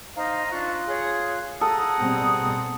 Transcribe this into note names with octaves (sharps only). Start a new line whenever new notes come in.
D#4 C5 D#5 F5
D4 F4 C#6 F#6
G#4 C#5
G#4 A4 F#5 A#5 D#6
B2 G3 C4